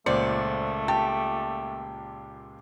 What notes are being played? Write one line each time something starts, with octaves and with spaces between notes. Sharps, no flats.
C#2 A#2 A3 C5 D5 C#7
G4 A5